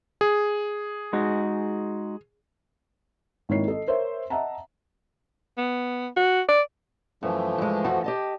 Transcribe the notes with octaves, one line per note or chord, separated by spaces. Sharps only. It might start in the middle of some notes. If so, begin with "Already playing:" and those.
G#4
G#3 D#4 F#4
G#1 D#3 A#3 E4 C#5 C7
A4 D#5
A#4 C5 C#5 E5
D#5 E5 F#5 A5 A#5
B3
F#4
D5
F#2 E3 F3 A3
G2 G#3
F2 F#4
G4 D#5 A5